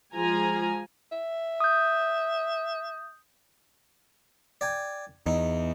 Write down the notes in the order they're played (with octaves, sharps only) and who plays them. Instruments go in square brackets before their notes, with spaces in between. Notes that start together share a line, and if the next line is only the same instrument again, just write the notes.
[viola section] F3 G#3 F4 G#5 A#5
[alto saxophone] E5
[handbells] D#6 G6
[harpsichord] D5 G5 G#5
[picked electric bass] E2 [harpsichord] D#4